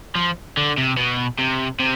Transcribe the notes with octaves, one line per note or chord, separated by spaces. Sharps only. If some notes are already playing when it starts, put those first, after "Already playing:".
F3
D3
C3
B2
C3
C3